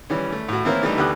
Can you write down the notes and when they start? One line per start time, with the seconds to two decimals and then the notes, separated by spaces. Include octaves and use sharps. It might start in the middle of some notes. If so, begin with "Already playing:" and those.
0.10 E3 G3 C#4
0.32 A3
0.49 A2 F#4
0.65 E3 A#3 C4 E4 A#4 C#5
0.83 E3 G3 A3 D4 D#4
0.98 D2 B3 G4 D#6 F#6